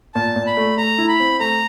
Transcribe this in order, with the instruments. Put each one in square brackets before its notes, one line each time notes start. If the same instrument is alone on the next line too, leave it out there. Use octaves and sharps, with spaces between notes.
[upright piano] A#2 [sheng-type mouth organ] A5
[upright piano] A#2
[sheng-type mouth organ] B5
[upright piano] A3
[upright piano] A3 [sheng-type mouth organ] A#5
[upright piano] E4
[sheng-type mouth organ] B5
[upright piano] C4
[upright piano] A3 [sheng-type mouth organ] A#5